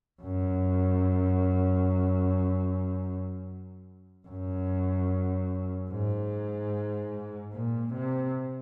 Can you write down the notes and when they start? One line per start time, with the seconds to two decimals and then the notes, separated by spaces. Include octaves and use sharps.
0.22 F#2
4.28 F#2
5.90 G#2
7.53 A#2
7.93 C3